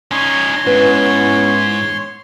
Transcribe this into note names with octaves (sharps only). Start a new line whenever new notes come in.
C#4 D#4 C#5 C6
G#2 B3 C#4 E4 B4